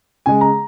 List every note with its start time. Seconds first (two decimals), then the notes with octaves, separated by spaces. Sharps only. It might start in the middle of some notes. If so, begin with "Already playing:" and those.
0.26 C#3 G#3 G#5
0.41 A#5